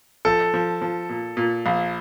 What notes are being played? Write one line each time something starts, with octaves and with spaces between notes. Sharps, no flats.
F3 A4
F3
F3
A#2
A#2
A#1